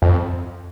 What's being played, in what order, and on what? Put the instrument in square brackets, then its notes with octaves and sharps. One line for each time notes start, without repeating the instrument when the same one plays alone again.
[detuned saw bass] F2